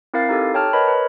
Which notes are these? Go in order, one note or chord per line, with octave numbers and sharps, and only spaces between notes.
C4 E4 A#4 F5 A6 C7
D#4 G4 A4
C#5 G5 A5 F6
A#4 B4 C#5 D#5 B5
B4